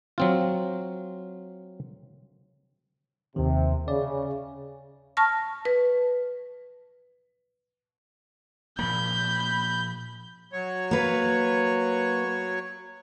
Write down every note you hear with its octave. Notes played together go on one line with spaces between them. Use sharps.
F#3 C4 F4
D#2 C3 D#3
C#3 D5
A5 C#6 F6 A#6
B4
A#2 F3 A#3 B5 G6
F#3 C#5
A#3 B4